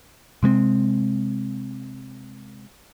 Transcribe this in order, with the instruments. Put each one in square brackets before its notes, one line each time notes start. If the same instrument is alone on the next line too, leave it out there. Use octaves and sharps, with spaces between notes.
[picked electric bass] C3 G#3 A#3 C4